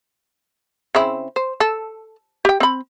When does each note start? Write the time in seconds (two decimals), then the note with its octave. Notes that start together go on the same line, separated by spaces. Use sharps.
0.95 C#3 C4 E4
1.36 C5
1.60 A4
2.45 G4 G5
2.60 C4 B5